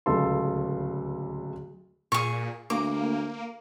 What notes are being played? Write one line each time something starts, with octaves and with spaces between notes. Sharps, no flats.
D1 C#2 C#3 A4 C6
A#2 G#4 C#6
D2 A#3 D6